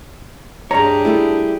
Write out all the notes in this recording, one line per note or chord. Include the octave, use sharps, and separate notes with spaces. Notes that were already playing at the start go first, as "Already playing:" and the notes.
G2 D4 G4 G#4 C#5 A#5
G3 A3 E4